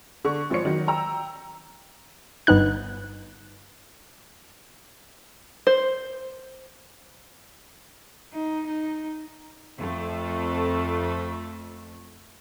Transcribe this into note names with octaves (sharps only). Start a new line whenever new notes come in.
D3 C#6
G#1 F3 C5 C#5 C#7
D#3 F#3
G5 A#5 E6
G1 B3 D#4 F#6
C5
D#4
D#4
F2 A3